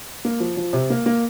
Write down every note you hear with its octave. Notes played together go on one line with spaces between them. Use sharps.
A#3
F3
F3
C3
A#3
A#3